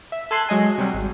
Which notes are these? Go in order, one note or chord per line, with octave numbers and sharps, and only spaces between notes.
E5
A4 G#5 C6 F#6 C7
F#3 G#3 D#5 G#5
C3 F#3 G3
G#1